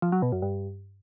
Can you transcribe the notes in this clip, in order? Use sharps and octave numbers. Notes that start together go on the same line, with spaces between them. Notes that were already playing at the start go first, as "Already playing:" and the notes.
F3
F#3
B2
F#2
G2